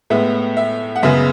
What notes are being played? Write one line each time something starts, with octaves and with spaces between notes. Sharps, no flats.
A2 G#3 B3 E5
E5
F#5
F#2 C#3 G#3 B3 E5